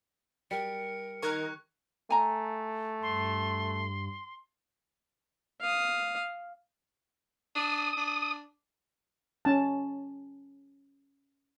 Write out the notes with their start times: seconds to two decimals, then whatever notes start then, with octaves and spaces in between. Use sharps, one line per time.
0.51 G3 A#4 C#7
1.22 D#3 A#4 C#6 F#6 G#6
2.10 A3 G#5 A#5
3.02 G2 C6
5.61 F5 D#6
7.55 D4 D#6
7.97 D4
9.45 C#4 A5